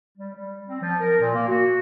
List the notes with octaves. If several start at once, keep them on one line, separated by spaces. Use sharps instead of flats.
G3
G3
C4
F3
A#4
A#2
A#3
F#4